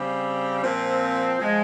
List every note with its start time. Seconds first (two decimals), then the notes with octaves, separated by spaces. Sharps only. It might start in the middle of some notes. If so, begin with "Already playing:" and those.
Already playing: C#3 G3 C4
0.61 A#2 F3 C4
1.40 F3 G#3